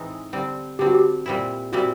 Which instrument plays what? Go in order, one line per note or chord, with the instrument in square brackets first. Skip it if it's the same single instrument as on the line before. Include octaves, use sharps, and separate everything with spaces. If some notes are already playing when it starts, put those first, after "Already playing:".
Already playing: [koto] A2 E3 G#3 C4 D#4
D3 G3 C4
[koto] D3 G3 C4 [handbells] G4
[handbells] F#4
G4
[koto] A#2 G3 C4 E4
[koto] A#2 G3 C4 E4 [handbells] F#4